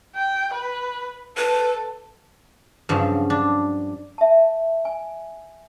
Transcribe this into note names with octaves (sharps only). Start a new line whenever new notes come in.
G5
B4
A4 B4
G2 C#3 F3 F#3
D4
E5 A5
G#5